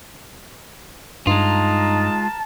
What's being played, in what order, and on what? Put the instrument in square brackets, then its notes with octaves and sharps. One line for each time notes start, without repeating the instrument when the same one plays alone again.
[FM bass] G2 [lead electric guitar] G#3 F4 [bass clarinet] D#4 [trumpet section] A#4 A5